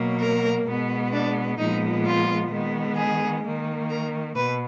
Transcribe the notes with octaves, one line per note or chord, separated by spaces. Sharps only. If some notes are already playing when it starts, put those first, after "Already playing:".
Already playing: B2 F#3 A#3
A#4
B2 G#3 B3
D4
A#2 F3 G#3 B3 D#4
F4
D#3 G#3 B3
G#4
D#3 A#3
A#4
B2 B4